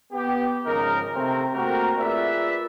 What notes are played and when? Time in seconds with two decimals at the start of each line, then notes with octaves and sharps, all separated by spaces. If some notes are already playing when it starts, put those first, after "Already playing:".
0.12 B3 G4
0.65 G#1 C#3 F3 D#4 A#4
1.15 C3 A3 C4 A#4
1.54 A3 A#3 C4 F#4 G4 A#4
1.98 F4 G#4 A#4 B4 D5 E5